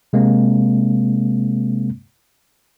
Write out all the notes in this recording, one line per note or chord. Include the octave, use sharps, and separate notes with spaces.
C3 G#3 A#3 C4